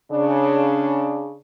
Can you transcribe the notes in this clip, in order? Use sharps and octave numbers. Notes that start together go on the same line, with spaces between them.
C#3 D4